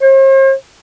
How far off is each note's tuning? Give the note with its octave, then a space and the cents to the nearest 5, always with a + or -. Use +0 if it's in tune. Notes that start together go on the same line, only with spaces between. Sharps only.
C5 +45